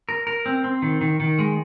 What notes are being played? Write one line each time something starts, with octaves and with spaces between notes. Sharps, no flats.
A#4
A#4
C4
C4
D#3
D#3
D#3
G#3